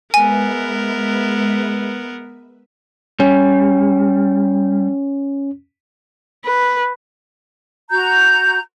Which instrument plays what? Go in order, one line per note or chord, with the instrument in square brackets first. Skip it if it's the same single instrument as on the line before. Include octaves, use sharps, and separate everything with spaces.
[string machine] G#3 B4 E5 [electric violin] B3 A#4 [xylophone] G#5
[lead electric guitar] G3 [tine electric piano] C#4
[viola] B4
[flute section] F#4 A#5 G6